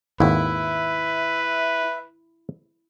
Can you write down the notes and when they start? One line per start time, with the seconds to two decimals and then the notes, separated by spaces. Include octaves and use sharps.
0.20 G#1 D#2 E4 B4 E5